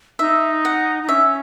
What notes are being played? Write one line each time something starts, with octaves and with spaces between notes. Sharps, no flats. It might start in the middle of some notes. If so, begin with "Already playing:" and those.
D#4 E5
F#5
D#4
C#4 E5